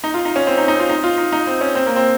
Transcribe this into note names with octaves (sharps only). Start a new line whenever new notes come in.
D#4
F4
D#4
C#4
C4
D#4
D#4
F4
D#4
F4
D#4
D#4
C4
C#4
C4
A#3
C4